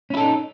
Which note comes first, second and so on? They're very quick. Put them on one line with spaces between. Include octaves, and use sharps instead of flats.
C#4 E4 A4 D#4